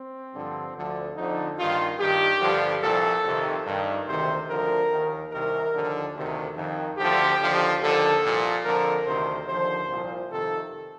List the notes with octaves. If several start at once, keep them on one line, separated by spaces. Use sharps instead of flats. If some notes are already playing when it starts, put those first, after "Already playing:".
Already playing: C4
G2 D3 F3
D2 D3 F3
F2 D3 F3 D#4
G2 D#3 F4
G2 D#3 G4
G2 D3 F3
C2 A#2 F3 A4
F2 C3 D#3
G2 D#3
D2 C3 D#3 C5
D2 D3 F3 A#4
D#2 D#3
C2 C3 D#3 A#4
D#2 D3 F3
D2 C3 D#3
F2 D#3
D2 D3 F3 G4
D#2 D3 F3
D#2 D3 F3 A4
C2 A#2 F3
F2 D3 F3 A#4
D2 C3 D#3 C5
D#2 D3 F3 C5
C2 A#2 F3
F2 C3 D#3 A4